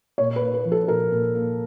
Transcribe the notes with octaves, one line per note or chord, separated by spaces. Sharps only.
A#2 C#5
B4
A#3
B4
F3
A4
A#2 A#4
A#2
A#3